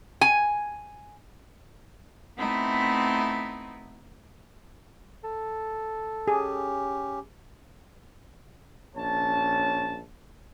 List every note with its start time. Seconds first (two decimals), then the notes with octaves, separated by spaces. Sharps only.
0.21 G#5
2.38 A3 B3 C4 D#4 E4
5.24 A4
6.28 C#4 G4 G#4
8.96 A#1 C#4 C#5 A5